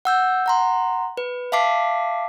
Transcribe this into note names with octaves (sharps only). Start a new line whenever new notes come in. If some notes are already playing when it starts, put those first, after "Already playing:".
F#5 E6 G6
F#5 A#5 C6
B4
E5 F5 A5 D6 B6 C7